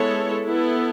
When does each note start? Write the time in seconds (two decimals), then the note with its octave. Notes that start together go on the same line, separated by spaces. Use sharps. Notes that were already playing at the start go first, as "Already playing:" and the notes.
Already playing: G#3 B3 E4 A4 C#5
0.45 B3 E4 A4